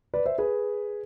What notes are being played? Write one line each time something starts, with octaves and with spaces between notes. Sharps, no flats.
B4 D5
C5 E5
G#4 B4